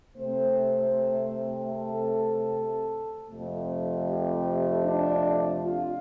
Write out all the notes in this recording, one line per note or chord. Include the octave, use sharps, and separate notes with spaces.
C3 A3 C4 C5
A4
F2 C3 A3
G4
D4
F4